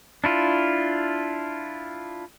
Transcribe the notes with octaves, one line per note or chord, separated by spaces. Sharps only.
D4 E4 F4